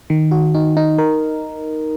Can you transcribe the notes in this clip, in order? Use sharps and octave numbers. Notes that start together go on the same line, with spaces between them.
D#3
F#4
D#4
D#4
A#4